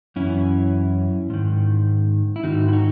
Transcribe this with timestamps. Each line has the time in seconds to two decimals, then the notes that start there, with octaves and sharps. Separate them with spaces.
0.16 F#2 E3 C#4 E4
1.30 G#2 D#3
2.36 E4
2.44 G#2 D#3 D#4 F#4
2.68 E4
2.73 D#4 F#4